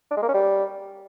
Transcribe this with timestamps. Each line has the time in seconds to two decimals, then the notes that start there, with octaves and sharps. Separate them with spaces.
0.11 D4
0.17 G#3
0.23 A#3
0.28 C#4
0.34 G3